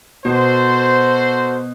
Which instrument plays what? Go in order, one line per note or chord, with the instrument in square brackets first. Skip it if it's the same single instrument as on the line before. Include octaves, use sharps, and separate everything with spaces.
[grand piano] B2 [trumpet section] F#4 A4 C5